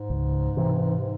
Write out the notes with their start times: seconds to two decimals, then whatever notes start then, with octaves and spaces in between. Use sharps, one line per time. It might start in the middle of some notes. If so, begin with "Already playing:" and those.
Already playing: G#2
0.10 C#2
0.57 C3 E3